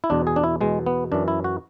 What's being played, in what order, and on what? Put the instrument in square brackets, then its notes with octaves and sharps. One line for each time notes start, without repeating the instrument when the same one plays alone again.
[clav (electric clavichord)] E4
E2 B2 D4
G#4
D4
E4
E2 B2 G#3
B3
F#2 E3 D4
E4
F#4